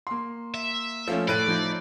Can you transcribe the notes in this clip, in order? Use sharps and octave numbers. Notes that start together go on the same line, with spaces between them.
A#3 C6
E5
F3 A3 C#4
A2 C#5 D5 F#6 D#7
F3 D#4 G6